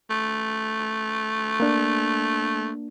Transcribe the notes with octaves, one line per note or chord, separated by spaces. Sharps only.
A3
A#3 D4